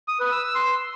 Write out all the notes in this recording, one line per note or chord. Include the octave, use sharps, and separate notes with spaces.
D#6
B4
E6
E6
C6